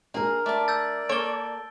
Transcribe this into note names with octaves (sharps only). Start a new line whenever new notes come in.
A#3 D4 G#4 A#4
A3 D5 A5
E6 G6 A6
A#3 A4 C#5 D7 G7